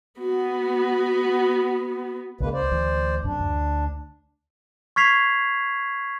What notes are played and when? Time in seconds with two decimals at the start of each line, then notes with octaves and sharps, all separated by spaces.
0.19 B3 F#4
2.40 C#2 C#3 G#3 A#3 B4
2.53 C5 D5
2.71 D2 E3
3.24 F#2 C3 D4
3.40 D2
4.96 C#6 F6 G#6 B6 C7 F7